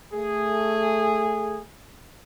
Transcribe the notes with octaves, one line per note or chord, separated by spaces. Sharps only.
A3 G#4